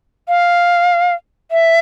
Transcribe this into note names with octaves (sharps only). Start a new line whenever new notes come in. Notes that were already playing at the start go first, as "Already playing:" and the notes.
F5
E5